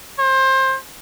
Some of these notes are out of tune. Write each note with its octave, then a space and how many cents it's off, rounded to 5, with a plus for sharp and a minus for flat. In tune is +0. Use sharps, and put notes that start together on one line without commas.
C5 +25